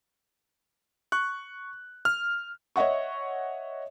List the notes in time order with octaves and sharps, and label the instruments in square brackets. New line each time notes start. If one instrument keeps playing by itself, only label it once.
[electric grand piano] C#6 F#6
F6
[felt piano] C#5 D#5 E5 F#5 C#6